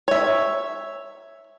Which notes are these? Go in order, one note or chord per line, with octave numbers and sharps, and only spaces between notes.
C#5 E5